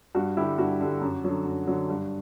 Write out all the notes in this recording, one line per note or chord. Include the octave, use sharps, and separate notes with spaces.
G2 F#4
D3 G3 E4 G4
G2 F#4
D3 G3
F#2
D3 F#3
F#2
D3 F#3
G2